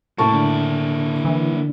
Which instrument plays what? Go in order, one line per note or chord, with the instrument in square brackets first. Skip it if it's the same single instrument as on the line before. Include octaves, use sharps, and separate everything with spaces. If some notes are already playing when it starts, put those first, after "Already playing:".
[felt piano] A2 A5 C#6 [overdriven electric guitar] A#3 E4
[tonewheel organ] D3 D4
[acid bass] E3